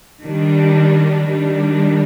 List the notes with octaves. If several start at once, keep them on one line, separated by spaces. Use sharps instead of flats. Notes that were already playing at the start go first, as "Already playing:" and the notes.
D#3 G3 D4
D#3 G3 D4